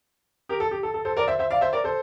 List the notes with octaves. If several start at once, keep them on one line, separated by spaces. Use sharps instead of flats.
G4 A#4
A4
G4
A4
A4
A4 C5
A#4 D5
C5 E5
C5 E5
D5 F5
C5 E5
A#4 D5
A4 C5